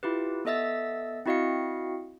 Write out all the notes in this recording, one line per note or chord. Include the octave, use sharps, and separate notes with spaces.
E4 F4 G4 B4
B3 A4 D#5 E5 E6 A6
C4 E4 F#4 D#5 F5 C#7